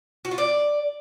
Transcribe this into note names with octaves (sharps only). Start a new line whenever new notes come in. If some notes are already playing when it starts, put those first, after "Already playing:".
F#4
F4
D5